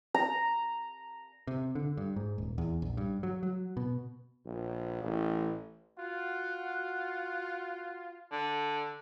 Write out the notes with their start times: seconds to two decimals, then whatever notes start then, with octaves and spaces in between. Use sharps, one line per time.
0.14 A#5
1.47 C3
1.75 D3
1.97 G2
2.16 G#2
2.38 D#1
2.58 E2
2.82 A#1
2.97 G2
3.23 F#3
3.43 F#3
3.77 B2
4.46 A#1
5.02 A1
5.99 F4 F#4 F#5
8.32 D3